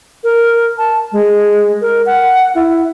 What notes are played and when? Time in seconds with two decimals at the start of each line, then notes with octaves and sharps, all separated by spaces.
0.24 A#4
0.78 A5
1.12 G#3
1.81 A#4
2.06 F#5
2.55 E4